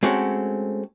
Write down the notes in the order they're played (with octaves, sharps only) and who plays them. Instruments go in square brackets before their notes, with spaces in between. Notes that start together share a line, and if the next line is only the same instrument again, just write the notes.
[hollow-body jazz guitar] G#3 A3 C4 C#4 F#4 A4